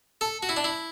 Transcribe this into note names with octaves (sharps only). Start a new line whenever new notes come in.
A4
F#4
E4
D4
E4